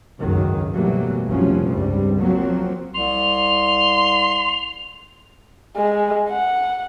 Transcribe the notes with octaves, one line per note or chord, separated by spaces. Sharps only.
G#1 C#2 F#2 A2 D#3 F#3
B2 E3 F#3 G3 A3 A#3
F1 C2 A#2 F3 F#3 C#4
C#2 G2 G3 C4
F3 F#3 A#3 C4
C2 C6 F7
G#3
F#5